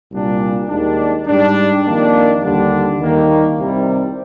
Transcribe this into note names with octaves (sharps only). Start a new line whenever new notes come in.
C2 A#2 G3 D4
D#2 D#3 G#3 D4
G#2 G3 D4
F2 D#3 A#3 D4
D#2 D3 G3 D4
D#2 D#3 G3 A#3
C2 C3 D#3 G3 C4